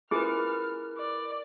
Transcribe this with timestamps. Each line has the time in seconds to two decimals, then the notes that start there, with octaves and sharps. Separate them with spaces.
0.11 E4 F4 G#4 A#4 B4 D6 F6
0.97 D5